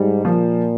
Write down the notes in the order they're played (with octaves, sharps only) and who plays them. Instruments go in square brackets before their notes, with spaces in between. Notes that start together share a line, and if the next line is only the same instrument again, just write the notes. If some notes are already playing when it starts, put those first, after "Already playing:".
Already playing: [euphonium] G#2 [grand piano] G3
[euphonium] A#2 [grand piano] F3